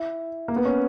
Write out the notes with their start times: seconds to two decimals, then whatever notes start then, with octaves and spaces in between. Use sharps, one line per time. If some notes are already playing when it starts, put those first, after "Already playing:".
Already playing: E4
0.48 A#3
0.56 B3
0.65 C#4